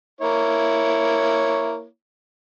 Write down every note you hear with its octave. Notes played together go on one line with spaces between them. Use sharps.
A#3 E4 C#5